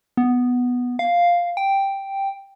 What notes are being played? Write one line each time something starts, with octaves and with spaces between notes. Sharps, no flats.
B3
F5
G5